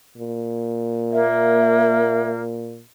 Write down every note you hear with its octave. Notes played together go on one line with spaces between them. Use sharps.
A#2
A#3 E5